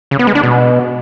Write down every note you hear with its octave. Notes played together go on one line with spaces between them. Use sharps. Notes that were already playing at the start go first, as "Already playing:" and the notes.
C#3
B3
G#3
D4
B2